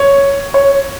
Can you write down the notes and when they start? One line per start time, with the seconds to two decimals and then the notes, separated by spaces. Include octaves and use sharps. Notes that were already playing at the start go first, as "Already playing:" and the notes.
Already playing: C#5
0.54 C#5